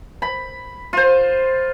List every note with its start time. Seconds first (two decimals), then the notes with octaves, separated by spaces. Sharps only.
0.22 B5
0.93 F4 C5